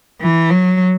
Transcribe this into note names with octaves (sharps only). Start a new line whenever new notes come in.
E3
F#3